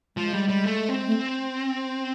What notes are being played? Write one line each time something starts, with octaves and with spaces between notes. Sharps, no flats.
F3 G#3
G3
G3
A3
C4
A3